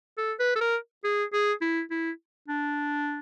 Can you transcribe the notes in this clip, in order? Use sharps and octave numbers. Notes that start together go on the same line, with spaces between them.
A4
B4
A4
A#4
G#4
G#4
E4
E4
D4